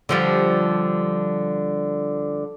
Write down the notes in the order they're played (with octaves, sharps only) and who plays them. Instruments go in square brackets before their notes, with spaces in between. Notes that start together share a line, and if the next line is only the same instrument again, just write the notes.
[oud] D3 F3 G3